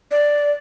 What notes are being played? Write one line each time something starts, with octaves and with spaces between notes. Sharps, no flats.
D5